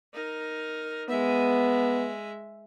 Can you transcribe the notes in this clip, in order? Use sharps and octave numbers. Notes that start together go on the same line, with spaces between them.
D#4 A#4
G#3 B3 E5